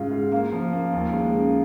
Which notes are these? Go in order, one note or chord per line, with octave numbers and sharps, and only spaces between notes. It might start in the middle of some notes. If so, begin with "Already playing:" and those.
Already playing: G#2 C#3 F4 F5
F4
A#3 F5
F3
A#3
D#2
G#3
C#3